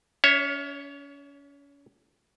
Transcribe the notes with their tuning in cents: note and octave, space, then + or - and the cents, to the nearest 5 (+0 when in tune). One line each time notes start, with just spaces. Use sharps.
C#4 +35 C#5 +0 E5 -15